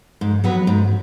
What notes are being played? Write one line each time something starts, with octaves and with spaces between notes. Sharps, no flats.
G#2
F#3 B3 F#4 B4
G#2